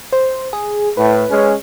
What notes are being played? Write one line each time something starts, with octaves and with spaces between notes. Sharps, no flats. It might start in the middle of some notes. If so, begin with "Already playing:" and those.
C5
G#4
A2 B4
G#3 C#4